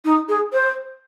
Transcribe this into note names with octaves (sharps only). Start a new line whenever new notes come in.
D#4
G#4
C5